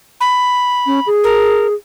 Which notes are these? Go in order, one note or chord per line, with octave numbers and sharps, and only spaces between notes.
B5
C#4
G#4
A#4